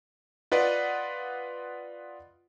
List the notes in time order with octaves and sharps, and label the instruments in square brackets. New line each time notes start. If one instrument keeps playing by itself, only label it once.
[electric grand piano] F4 B4 D5 D#5 F#5